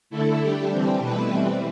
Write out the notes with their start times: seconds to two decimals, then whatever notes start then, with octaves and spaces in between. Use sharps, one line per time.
0.10 D3 A3 E4 A4
0.40 G3 D4 G4
0.69 E3 G3 C4 G4
0.99 B2 A3 E4 B4
1.29 E3 G3 C4